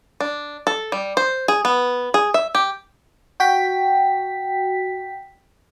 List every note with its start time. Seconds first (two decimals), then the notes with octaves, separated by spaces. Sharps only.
0.20 D4
0.67 A4
0.92 G3
1.17 C5
1.48 G#4
1.65 B3
2.14 G#4
2.34 E5
2.55 G4
3.40 F#4 G5 B6